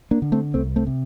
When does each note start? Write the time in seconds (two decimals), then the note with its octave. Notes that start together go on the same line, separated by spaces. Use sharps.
0.11 A#3 D4
0.22 D3
0.32 A3 C4
0.54 C2 A3 C4
0.76 A3 C4
0.87 C3